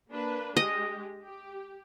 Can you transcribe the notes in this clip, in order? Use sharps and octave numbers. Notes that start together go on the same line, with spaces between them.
A#3 D4 B4
G#3 G4 D#5
G4